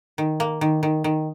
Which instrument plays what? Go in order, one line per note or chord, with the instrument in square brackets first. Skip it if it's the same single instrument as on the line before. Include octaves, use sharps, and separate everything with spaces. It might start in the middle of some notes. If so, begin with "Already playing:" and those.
[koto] D#3
A#3
D#3
D#3
D#3